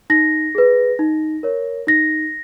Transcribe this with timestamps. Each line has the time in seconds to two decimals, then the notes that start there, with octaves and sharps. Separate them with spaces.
0.10 D#4 A#6
0.55 G#4 B4
0.99 D#4
1.43 A#4 C#5
1.87 D#4 A#6